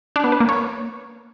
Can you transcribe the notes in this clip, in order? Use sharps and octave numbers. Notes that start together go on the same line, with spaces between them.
D4
B3
B4
A#3
C#5